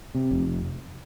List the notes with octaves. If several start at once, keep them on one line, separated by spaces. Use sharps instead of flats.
C3
F1